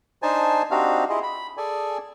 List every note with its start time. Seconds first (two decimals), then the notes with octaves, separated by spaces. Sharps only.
0.23 D4 D#4 C5 G#5 A5
0.71 C4 D4 D#4 F#4 G4 F5
1.09 E4 F4 G#4 D#5
1.23 B5
1.57 G#4 A4 D5 G#5